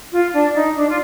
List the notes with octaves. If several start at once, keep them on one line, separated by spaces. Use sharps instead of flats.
F4
D4
D#4
D4
F4